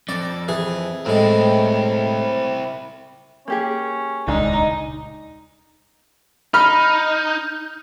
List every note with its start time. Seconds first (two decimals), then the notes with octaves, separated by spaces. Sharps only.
0.09 F2 D5
0.48 E3 G#4
1.06 A2 G#3 C4 E4
3.48 A#3 C#4 G4 G#4
4.28 D#1 C#2 G3 G#3 D4 D#4
6.54 D#4 B5 F6